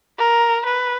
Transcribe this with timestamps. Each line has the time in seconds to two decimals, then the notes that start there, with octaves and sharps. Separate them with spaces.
0.19 A#4
0.65 B4